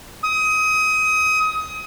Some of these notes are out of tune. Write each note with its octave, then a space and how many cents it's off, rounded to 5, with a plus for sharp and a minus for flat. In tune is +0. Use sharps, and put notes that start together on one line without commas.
D#6 +25